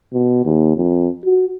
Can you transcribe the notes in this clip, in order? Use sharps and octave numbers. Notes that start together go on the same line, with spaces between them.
B2
D#2
F2
F#4